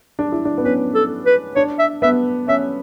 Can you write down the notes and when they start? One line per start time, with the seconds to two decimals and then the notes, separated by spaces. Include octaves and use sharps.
0.19 D4
0.32 E4
0.45 D4
0.58 B3
0.64 C#4 B4
0.95 A4
1.26 B4
1.56 D4 C#5
1.79 E5
2.02 B3 E5
2.48 C#4 E5